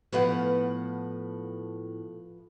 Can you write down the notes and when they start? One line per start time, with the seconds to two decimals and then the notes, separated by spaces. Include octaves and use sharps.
0.13 A2 F3 B3 B4 F#5